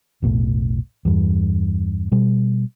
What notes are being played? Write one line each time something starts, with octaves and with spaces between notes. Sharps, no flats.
F1 B1 A2
E2 G2
B2 G3